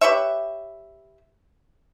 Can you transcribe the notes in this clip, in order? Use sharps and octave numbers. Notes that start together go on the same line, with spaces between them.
G4 B4 C#5 E5